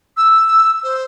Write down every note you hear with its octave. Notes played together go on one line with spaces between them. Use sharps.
E6
C5